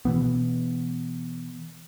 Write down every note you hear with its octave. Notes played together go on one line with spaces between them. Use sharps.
B2 E3 B3